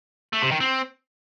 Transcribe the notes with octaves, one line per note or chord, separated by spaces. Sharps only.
A3
C3
D#3
C4